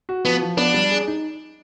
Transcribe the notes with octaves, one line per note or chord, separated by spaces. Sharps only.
F#4
F3 B3
F3
B3 D4
G3
G#4
D#4